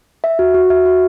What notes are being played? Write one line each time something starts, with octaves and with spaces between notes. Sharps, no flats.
E5
F#4
F#4
E5
F#4